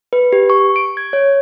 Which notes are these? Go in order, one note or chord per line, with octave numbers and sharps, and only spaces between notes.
B4
G4
C#6
D7
G#6
C#5